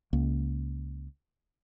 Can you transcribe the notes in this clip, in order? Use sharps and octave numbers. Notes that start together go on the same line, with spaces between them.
C#2 A#3